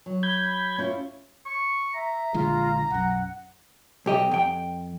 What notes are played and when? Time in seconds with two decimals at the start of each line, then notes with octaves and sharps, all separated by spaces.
0.06 F#3
0.23 B5 G6 G#6
0.78 C#4 E4 F4
1.46 C#6
1.94 E5 A#5
2.34 A#1 D3 G#3 F4
2.90 B1 F#2 F#5
4.06 B1 G4 D#5
4.31 F2 G5